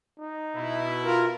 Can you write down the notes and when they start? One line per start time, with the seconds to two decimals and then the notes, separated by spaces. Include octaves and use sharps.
0.18 D#4
0.56 B2 E4
1.05 F4 A#4